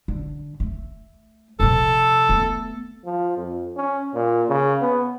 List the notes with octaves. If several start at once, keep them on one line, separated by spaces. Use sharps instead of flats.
D3
A3
C3 F3 A4
A3 B3
F3
F2
C#4
A#2
C#3
B3